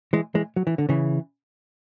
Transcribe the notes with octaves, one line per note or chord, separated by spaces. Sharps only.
E3 G#3
E3 G#3
F#3
E3
D3
C#3 E3